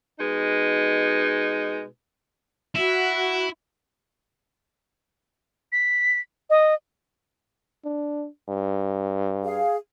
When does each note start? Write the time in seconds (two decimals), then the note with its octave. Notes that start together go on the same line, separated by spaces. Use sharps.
0.18 B2 G#3 D#4
2.76 E4 F#4
5.72 B6
6.50 D#5
7.84 D4
8.48 G2
9.44 G#4 F5